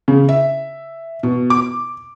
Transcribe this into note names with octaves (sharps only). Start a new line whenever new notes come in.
C#3
E5
B2
D6